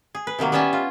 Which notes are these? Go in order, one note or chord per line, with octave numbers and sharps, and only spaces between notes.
G#4
B4
C3 D#3 F#3 A#3
G3 B3 C#4 E5 G#5 A5
F4